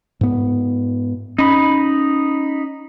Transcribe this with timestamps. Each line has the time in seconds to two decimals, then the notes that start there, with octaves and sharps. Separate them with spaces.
0.21 G#2 B3
1.38 C#4 D#4 B5